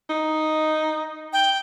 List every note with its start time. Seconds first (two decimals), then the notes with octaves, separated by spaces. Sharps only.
0.09 D#4
1.33 G5